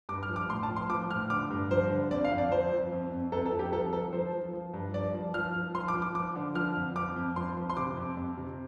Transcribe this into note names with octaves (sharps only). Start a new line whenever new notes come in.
G2 D6
F6
F3
D6
A2 C6
A5
F3
C6
F3 D6
A2 F6
D3 D6
G2
F3 C5
D3
F2 D5
F5
F2
D5
F3 C5
F3
F2
F2
F2 A4
A4
F3
G4
F3 A4
F3 A4
F3 C5
F3
F3
G2
F3 D5
F3
F3 F6
F3
F3 C6
D6
F3
D6
F3 D6
D3
F3 F6
F2
F3 D6
F2
F3 C6
F3
C6
C3 D6
F2
F2
C3